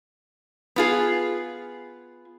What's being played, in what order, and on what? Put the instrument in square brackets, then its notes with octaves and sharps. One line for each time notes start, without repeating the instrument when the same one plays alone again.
[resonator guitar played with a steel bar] B3 F4 G#4